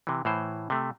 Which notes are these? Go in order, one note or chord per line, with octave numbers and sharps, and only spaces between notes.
C3 E3
A2 E3 C5
C3 A3